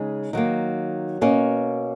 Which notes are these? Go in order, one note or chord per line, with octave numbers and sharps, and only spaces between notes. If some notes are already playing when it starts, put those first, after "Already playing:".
Already playing: C#3 G#3 D#4
D#3 F#3 A#3
B2 A#3 C#4